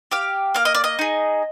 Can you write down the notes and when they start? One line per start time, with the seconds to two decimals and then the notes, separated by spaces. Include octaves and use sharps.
0.11 G4 F5
0.54 A#3 F5
0.65 D#5
0.75 D5
0.84 D#5
0.99 D#4 G#4